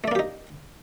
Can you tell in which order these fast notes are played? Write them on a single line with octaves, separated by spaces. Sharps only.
A3 D5 A#3 G4 D#4